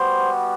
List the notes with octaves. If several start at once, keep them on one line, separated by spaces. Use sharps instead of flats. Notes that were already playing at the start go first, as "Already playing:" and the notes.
Already playing: G3 B3 F#4 C5